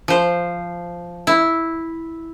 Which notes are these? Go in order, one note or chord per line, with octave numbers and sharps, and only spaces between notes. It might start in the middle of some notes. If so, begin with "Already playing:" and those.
F3 C5
E4